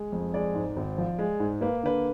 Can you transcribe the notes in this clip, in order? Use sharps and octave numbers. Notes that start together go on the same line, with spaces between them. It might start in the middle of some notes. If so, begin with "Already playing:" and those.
Already playing: G#3
F2
G#3 D5
G#2
G#1
F3
G#3
G#2
A#3 B4
D3 B4